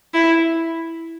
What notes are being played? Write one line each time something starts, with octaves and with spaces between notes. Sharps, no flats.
E4